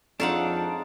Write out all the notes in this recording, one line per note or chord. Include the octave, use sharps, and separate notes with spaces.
F2 G#3 D4 D#4 A4 C#5 F5 F#5